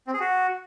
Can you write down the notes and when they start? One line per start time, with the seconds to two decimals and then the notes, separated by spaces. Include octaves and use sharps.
0.07 C4
0.14 G#4
0.20 F#4